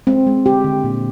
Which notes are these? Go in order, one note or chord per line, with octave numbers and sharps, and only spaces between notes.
G#3 C4
G#3
D3 G4
D3
A#2